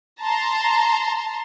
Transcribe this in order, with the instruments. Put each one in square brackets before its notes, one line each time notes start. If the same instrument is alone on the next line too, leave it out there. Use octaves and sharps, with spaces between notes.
[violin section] A5 A#5 C6